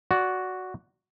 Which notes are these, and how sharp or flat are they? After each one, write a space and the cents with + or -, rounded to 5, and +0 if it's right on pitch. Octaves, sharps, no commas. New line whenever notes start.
F#4 +0 D5 -20